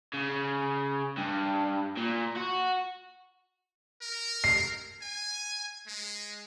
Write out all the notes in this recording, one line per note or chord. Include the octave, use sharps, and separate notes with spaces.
C#3
G2
A#2
F#4
A#4
C7
G#5
G#3